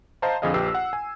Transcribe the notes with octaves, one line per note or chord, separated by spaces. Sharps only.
C5 D#5 F5 A5 A#5
F2 D3 G#4 D#5 F5
A#1 G4 B4 E6 C7
F#5
G#5